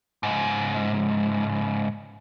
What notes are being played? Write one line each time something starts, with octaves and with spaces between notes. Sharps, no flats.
C#2 G#2